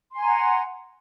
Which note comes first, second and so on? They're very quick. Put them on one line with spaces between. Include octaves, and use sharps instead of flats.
C6 G#5 A#5 F#5